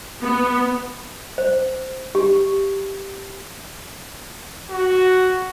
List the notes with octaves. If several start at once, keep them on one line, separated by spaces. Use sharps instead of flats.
B3
C5
G4
F#4